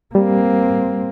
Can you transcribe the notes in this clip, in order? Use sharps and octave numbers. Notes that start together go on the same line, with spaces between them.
G3 A#3 C4